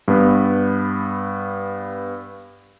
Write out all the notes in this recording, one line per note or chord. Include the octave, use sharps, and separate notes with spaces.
G2 B3